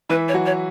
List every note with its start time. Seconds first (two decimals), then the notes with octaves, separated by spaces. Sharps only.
0.09 E3 E4 B4
0.28 C#5
0.34 F#3 F#4
0.46 C#5